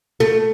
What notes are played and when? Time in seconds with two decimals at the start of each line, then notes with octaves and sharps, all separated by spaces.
0.20 A3